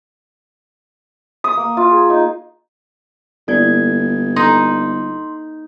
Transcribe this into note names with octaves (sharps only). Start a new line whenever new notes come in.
D#6
A#3
F4
G#4
D#4
G1 A#3 E4 A4 D5 G#6
D#4 A4 A#5 C6